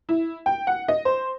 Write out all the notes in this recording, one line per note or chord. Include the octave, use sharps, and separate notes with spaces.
E4
G5
F#5
D#5
C5